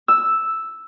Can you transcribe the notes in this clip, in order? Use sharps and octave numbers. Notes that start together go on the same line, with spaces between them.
E6